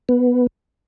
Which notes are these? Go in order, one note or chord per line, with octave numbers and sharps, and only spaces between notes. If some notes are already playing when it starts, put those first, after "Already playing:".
B3